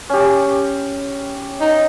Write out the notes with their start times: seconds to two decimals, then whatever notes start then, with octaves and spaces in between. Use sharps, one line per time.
0.09 C#4 G4
1.61 D#4